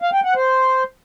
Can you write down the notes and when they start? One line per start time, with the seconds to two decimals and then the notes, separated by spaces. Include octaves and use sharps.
0.02 F5
0.13 G5
0.24 F#5
0.35 C5